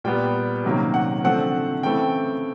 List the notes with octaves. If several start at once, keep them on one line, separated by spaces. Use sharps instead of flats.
A#2 G3 B3 G5
C3 D#3 F#3 A#3 C#4
F#5
D3 F3 A3 C4 F#5
C#3 E3 A3 C4 G5